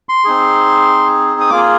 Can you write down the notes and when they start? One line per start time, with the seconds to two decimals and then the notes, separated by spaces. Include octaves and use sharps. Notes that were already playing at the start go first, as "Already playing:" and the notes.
0.09 C6
0.25 C4 D#4 G#4
1.40 D#6
1.50 A#3 F4 G#4 D6